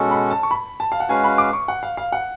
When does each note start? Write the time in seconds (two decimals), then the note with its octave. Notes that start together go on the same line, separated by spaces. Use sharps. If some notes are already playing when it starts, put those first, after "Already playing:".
Already playing: B2 G#3 C#4 F#4 A4
0.11 B5
0.30 A5
0.43 C#6
0.51 B5
0.80 A5
0.92 F5
1.00 F#5
1.09 G#3 C#4 F#4 B4 F5 G#5
1.24 B5
1.38 D6
1.53 C#6
1.68 F#5
1.83 F5
1.97 F5
2.12 F#5